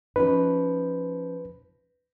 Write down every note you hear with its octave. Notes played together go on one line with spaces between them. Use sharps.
F3 C#4 D#4 B4